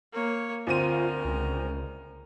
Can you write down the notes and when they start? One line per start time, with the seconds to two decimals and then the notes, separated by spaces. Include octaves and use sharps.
0.12 A#3 C#5
0.67 D2 C4 F4 A#4 D#7
1.25 C#2